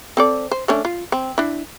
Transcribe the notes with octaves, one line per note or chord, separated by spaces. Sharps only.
C4 A4 D5
C5
A3 C#4 D4
F4
C4
D4 E4